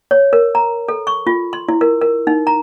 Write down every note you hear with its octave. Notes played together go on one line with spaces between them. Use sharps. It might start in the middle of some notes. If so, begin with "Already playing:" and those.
C#5
A#4
A#5
A4
C#6
F4
C6
E4
A#4
A#4
D#4
A#5